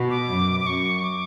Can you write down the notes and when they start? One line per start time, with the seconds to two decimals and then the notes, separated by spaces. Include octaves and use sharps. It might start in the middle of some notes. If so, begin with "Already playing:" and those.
Already playing: B2
0.10 D6
0.30 F#2
0.60 D6
0.66 F#2 C#6
1.04 D6